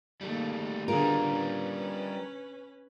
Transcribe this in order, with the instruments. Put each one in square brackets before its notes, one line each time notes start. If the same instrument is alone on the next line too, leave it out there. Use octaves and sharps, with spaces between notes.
[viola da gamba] D#3 A#3 [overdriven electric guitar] G3 A3
[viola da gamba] D3 B3 G#4 [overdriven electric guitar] G3 F4 [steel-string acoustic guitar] A#4
[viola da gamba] C#4 B4